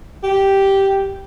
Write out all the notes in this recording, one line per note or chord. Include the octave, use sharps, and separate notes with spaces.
G4